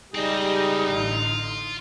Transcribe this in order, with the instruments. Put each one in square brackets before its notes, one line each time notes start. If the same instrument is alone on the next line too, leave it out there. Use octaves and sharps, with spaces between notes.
[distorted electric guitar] C#2 C4 [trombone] G3 [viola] D#4 [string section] G4 G#4 D#5
[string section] A1 D3 [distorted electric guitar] F4